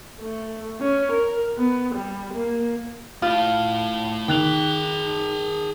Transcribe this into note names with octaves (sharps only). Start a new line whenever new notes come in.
A3
C#4
A#4
B3
G3
A#3
A3 E4 F4
D#3 G#4 G5 F#6 F7